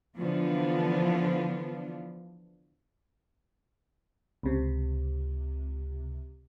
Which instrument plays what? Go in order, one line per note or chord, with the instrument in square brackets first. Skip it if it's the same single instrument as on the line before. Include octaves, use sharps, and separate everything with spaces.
[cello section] D3 E3 F3 B3 D4 F4
[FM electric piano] C#2 C3